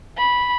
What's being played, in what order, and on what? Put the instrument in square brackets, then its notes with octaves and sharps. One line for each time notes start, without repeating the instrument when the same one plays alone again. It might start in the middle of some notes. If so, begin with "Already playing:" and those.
[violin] B5